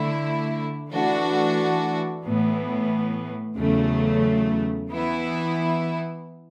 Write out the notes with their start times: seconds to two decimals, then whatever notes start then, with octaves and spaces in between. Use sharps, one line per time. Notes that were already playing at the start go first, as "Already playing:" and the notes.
Already playing: D3 A3 E4
0.91 E3 A3 D4 F#4
2.24 A2 E3 B3
3.56 E2 C#3 F#3 A3
4.90 E3 B3 E4